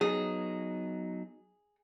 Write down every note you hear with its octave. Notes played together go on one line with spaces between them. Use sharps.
F#3 B3 D#4 G#4